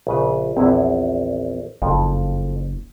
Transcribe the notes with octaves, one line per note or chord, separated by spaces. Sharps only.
A#1 C#3 B4
A#1 E2 C4 E4
F#1 F2 F3